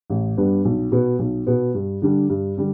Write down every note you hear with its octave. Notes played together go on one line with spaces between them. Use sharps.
A1
G2 G3 B3 D4
B1
B2 B3
B1
B2 B3
G2
D3 G3 D4
G2
D3 G3 D4